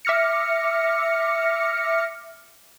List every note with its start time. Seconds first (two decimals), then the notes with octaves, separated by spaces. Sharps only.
0.05 E5 D6 F6 A#6 C#7